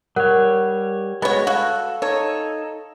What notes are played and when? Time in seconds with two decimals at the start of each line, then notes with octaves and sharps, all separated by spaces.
0.16 G3 A#4 C#5 F#5 F#6
1.22 G#3 B3 F#4 C#5
1.47 F#4 A4 F5
2.02 D#4 A4 C#5